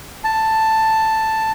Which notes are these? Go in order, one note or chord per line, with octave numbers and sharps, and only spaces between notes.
A5